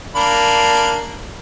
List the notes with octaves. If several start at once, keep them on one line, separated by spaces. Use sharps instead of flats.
A#3 D4 B5